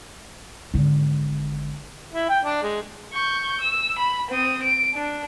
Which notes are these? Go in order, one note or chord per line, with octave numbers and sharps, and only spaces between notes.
G#1 D3
E4
G5
D4
G#3
C#6 G6
E6
B5
C4 D#6
D7
D4